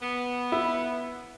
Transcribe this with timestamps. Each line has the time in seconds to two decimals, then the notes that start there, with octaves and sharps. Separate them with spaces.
0.02 B3
0.52 E4